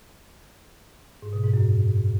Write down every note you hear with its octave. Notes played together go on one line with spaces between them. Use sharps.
G#2
B2
G#2
F#2